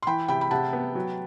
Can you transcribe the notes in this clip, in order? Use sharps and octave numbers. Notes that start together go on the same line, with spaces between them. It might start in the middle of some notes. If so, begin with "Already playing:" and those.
C6
E3 G5 B5
C3 G5 B5
B5
C3 F#5 A5
B3
F#3